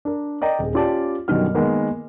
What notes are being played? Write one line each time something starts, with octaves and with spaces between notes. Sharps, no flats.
D4 A#4
A#4 D5 D#5 G5 A#5
D#1 G#4
C#4 F4 G4 D5 A5
F#2 B2 D3 D#3 G3 F6
D#3 G#3 A#3 B3